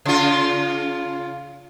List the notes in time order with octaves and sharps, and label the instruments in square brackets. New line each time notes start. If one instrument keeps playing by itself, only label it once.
[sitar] C#3 F4